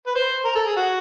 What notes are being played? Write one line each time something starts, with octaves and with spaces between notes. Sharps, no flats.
B4
C5
A#4
A4
G#4
F#4